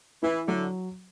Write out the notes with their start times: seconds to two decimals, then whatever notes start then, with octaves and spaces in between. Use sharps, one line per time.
0.23 E3 E4
0.48 D3 F#3